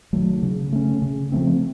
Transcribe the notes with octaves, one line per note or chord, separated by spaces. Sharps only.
D#3 F#3 A3
C#3
A3 C#4
C#3
F3 A3 C4